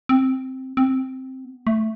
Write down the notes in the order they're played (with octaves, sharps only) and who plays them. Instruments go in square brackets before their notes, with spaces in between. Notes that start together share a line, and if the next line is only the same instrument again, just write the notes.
[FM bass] C4
C4
B3
A3